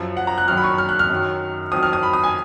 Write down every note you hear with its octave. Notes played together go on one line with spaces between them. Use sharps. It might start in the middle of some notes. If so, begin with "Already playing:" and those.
Already playing: F#2 F3
F#5
A#5
F#6
F#2 D#3 F#3 F6
B5
C#6
F6
F#6
F6
F#2 D#3 F#3
F2 D#3 F#3 D#6
F6
D#6
B5
D#6
G#5